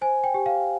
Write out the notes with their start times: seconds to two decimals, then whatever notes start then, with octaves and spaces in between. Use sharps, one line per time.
0.01 C5 G#5
0.24 G5
0.34 G4
0.46 F5